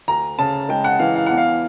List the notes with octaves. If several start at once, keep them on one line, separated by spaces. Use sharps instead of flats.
D2 A#5
C#3 A5
G#3 G5
F#5
E3 F5
F5
E2 F#5
F5